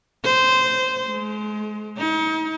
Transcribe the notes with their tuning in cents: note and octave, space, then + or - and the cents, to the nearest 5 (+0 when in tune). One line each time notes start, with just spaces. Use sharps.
C5 -15
G#3 +35
D#4 +40